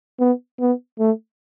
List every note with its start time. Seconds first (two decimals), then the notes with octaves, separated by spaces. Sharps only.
0.20 B3
0.60 B3
0.99 A3